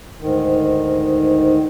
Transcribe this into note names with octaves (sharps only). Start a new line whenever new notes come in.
D2 G#2 D#3